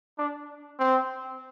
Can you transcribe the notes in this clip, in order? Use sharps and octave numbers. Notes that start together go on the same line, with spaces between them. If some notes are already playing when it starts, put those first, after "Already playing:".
D4
C4